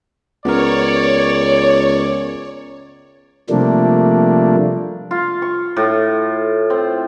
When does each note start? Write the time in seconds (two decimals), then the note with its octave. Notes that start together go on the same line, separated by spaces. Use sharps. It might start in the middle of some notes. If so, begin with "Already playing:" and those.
0.45 C#2 B3 A#4 C#5 D5
3.50 C3 F3 G3 A3 A#3 D4
5.11 F4
5.42 C#6
5.77 A2
6.70 C4